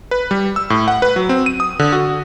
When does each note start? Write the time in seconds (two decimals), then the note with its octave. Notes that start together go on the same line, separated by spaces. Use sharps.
0.11 B4
0.31 G3
0.56 E6
0.70 A2
0.88 F#5
1.02 B4
1.16 F#3
1.29 C4
1.46 D#7
1.60 D#6
1.79 D3
1.92 F#4